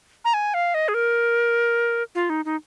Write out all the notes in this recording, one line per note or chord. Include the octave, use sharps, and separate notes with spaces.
A#5
G#5
F5
D#5
G#4
A#4
F4
D#4
D#4